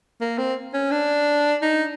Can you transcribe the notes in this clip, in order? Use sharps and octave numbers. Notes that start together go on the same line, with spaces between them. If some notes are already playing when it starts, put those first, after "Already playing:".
A#3
C4
C#4
D4
D#4